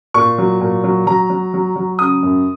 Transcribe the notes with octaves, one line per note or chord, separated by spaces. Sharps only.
A#2 C#6
F#3
A#2
F#3
F#3 A#5
F#3
F#3
F#3
C#3 D#6
F#2